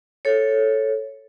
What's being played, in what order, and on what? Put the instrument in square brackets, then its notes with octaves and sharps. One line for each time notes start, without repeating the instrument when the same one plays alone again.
[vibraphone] A4 C#5